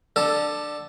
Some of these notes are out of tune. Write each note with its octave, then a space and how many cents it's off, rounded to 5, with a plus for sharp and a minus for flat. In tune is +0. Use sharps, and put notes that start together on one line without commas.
D3 +15 A4 +0